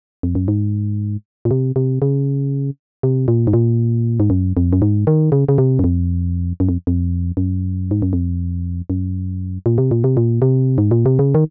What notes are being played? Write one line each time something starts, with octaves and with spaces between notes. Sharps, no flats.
F2
F#2
G#2
A#2
C3
C3
C#3
C3
A#2
G#2
A#2
G#2
F#2
F2
F#2
G#2
D#3
C#3
C#3
C3
F#2
F2
F#2
F2
F2
F#2
G#2
F#2
F2
F#2
A#2
C3
A#2
C3
A#2
C3
G#2
A#2
C3
C#3
D#3